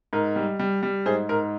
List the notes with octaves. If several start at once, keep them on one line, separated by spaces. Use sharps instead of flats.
G#2 A#4
G3
G3
G3
G#2 G#4 C5
G#2 A#4